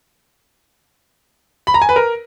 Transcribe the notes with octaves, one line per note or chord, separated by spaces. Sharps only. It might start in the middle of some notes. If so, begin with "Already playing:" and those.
B5
A#5
G#5
B4
A#4